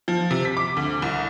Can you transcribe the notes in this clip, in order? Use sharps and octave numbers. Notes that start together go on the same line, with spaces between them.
F3
C3
B6
D6
D2
C2